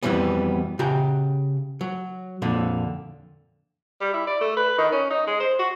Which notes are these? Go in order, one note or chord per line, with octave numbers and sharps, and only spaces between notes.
F2 G#2 B2 E3 G3 B3
C#3 F#4 G4 A#5
F#3
F2 A#2 D3
G3
E4
D5
A3
B4
D#3
C#4
D#4
G#3
C5
F#4